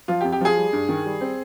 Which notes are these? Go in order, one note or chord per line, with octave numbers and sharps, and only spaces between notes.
F3 F4
G4
F2
G4
F3 G#4
G3
G2
D#3
G3
C4